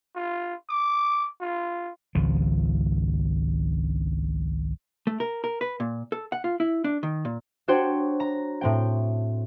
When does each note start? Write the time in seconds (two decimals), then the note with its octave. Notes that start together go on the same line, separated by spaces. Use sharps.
0.15 F4
0.69 D6
1.41 F4
2.15 G#1 C#2 F3
5.07 A3
5.20 A#4
5.44 A#4
5.61 B4
5.80 A#2
6.12 A4
6.32 F#5
6.44 F4
6.60 E4
6.84 D4
7.03 D#3
7.25 A#2
7.68 D4 F#4 C5 C#5 G5
8.20 A#5
8.61 A2 C4 G5